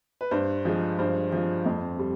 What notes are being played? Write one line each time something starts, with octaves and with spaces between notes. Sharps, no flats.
B4
G2 C5
F3 G#3
G2 C5
F3 G#3
F2
G3